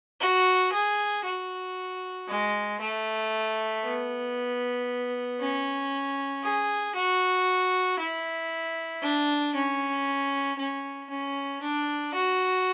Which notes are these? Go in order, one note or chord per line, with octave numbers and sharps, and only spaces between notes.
F#4
G#4
F#4
G#3
A3
B3
C#4
G#4
F#4
E4
D4
C#4
C#4
C#4
D4
F#4